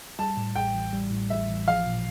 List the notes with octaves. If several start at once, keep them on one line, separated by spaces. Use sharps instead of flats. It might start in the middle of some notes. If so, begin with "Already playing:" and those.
G3 A5
A2
A1 G5
A1
G3
A2
A1 E5
A1
F3 F5
A#2